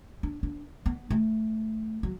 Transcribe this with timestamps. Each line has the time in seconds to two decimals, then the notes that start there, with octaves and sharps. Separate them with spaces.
0.23 D4
0.43 D4
0.86 B3
1.10 A3
2.03 F#3